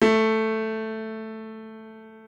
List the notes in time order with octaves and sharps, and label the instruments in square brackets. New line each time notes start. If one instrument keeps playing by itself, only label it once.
[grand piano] A3